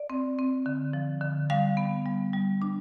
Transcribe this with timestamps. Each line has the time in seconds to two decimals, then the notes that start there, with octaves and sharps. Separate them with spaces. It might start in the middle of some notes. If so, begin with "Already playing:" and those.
Already playing: D5
0.10 C4
0.39 C4
0.66 D3
0.93 F3
1.21 D3
1.50 G3 F5
1.77 B3
2.06 G3
2.33 G3
2.62 D4